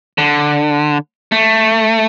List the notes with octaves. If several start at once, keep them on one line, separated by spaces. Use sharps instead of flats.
D3
A3